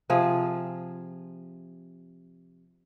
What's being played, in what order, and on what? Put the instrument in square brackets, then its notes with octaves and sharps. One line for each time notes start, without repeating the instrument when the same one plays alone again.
[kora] C3 F3 G#4